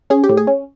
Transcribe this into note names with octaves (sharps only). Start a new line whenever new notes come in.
C#4 G#4
G4
A2
G#4
C#4